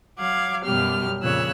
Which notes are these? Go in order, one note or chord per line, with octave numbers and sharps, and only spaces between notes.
F#3 F5 F#5 D6 G#6
F#2 B2 F#3 G3 G4 F6
F2 A#2 C#3 C#5 E6 F#6